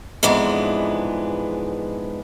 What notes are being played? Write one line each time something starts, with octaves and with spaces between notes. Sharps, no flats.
F2 G#2 E3 G#3 B3 D4